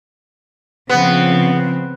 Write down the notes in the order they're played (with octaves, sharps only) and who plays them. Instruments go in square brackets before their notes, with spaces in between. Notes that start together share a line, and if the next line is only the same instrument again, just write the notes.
[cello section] C#3 F3 C4 [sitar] B3